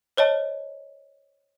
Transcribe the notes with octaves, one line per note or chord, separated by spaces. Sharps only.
C5 C#5 D#5 A5